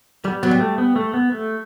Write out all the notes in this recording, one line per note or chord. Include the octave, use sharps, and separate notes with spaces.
G3 B3
F#3 B3
G3
A3
B3
A3
B3
A3